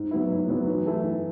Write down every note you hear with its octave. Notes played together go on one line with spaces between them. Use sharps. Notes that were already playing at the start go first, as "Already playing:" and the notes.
Already playing: G#2
F#3 B3 E4
G#2
F#3 B3 E4
E3
A3 E4 A4
E3